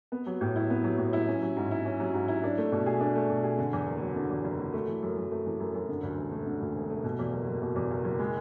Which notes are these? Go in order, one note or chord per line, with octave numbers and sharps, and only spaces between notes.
B3
F#3
A2
E4
B3
F#3
A2
E4
C#4
F#3
G#2
E4
C#4
F#3
G#2
E4
D4
A3
B2
G#4
D4
A3
B2
G#4
D3
E2
F#1
F#3
D3
E2
F#1
F#3
A3
E3
F#2
F#2
A3
E3
F#2
F#2
D3
D2
E1
A3
D3
D2
E1
A3
B2
E2
F#1
F#1
B2
E2
F#1
F#1
G#3